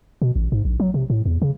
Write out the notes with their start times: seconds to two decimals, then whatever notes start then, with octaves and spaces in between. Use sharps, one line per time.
0.22 B2
0.36 A1
0.52 G#2
0.65 A#1
0.80 F#3
0.94 C3
1.10 A2
1.25 E2
1.42 C#3